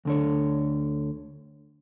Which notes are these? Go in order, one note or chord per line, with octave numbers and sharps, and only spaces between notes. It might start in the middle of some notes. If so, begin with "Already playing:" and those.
D2 D3 C#5